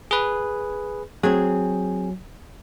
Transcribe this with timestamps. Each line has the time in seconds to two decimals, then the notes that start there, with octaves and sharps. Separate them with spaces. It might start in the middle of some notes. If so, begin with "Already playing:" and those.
0.11 G#4 B4
1.23 F#3 C4 G#4